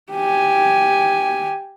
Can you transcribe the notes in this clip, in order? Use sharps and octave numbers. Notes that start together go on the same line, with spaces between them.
G4 G#5